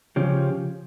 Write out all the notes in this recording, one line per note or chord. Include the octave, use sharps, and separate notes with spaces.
C#3 F3 C#4 G4